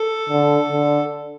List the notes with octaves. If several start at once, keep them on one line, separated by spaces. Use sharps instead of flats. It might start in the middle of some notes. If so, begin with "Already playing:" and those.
Already playing: A4
D3
D3